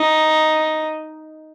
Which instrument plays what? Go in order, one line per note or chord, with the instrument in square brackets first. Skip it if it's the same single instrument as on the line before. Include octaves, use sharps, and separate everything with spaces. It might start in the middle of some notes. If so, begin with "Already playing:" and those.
Already playing: [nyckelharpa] D#4